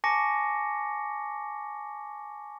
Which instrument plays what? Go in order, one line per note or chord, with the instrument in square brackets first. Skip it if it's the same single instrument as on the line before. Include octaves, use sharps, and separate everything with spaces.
[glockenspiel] G#5 A5 C#6 D6 A#6 C#7